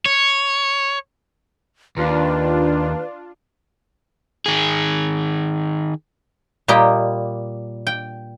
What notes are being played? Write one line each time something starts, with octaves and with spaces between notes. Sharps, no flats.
C#5
D#2 D4 F4 B4
D#3 G#4
A#2 G3 A#3 G4 D#5 G5
G5